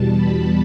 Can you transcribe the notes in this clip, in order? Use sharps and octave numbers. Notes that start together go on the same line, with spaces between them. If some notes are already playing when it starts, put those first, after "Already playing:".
Already playing: E2 B2 G3 A5
B5